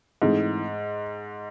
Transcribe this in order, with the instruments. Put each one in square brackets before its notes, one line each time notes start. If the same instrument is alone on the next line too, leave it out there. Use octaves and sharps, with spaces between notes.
[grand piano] G#2 [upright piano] E3 A3 C4 D#4 G#4